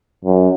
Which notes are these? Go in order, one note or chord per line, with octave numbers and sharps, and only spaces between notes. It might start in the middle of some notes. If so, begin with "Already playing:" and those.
F#2